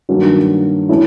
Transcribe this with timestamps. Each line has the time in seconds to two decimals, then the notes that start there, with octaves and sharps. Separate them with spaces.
0.09 G2 D#3 F#3 A#3 C#4
0.89 E3 A3 C#4 E4